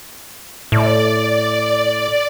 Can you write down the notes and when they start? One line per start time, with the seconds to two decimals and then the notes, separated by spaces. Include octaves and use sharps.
0.72 A2 D5